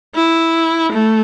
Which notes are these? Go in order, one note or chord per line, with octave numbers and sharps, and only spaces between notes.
E4
A3